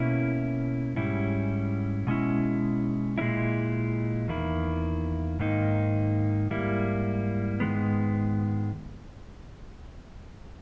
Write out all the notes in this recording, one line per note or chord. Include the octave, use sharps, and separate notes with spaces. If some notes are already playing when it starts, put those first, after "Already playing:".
Already playing: B2 A#3 C#4 E4
G#2 G3 C#4 E4
B2 G#3 C#4 E4
A#2 G#3 C#4 E4
E2 D#3 A#3 E4
G#2 D#3 A#3 D#4
G#2 G3 A#3 E4
G#2 D#3 G#3 B3